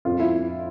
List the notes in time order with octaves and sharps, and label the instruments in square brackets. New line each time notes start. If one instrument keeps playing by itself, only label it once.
[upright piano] F2 F4
E4